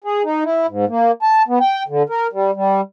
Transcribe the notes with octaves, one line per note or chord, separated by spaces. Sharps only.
G#4
D#4
E4
G#2
A#3
A5
B3
G5
D3
A#4
G3
G3